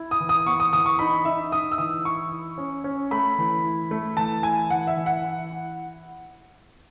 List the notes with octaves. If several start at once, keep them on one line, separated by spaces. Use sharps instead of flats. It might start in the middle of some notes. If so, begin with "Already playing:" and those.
Already playing: E4
D#6
E3
D#6
B3 C#6
D#6
E3 D#6
C#6
D#4 B5
D#4 E5
D#4 D#6
E6
E3 D#6
E4 C#6
E4
C#4
C#4
A3 B5
E3
E4
A3
E3 A5
E4 G#5
E3 F#5
E5
E3
F#5
E4
E4